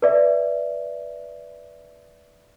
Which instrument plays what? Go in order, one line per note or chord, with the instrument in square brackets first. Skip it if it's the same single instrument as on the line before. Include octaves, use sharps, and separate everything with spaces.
[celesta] B4 D5 E5